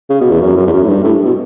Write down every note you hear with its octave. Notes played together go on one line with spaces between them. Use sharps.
C#3
B2
E2
F#2
F#2
E2
F#2
A2
G2
A2
B2